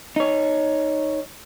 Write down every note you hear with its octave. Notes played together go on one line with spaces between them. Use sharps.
D#4 C#5